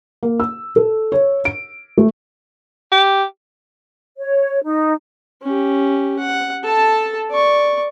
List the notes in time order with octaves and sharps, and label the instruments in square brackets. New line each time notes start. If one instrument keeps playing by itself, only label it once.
[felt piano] A#3
E6
A4
C#5
D7
A3
[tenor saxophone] G4
[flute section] C#5
D#4
[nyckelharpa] C#4 G4
F#5
A4 A5
D5 C#6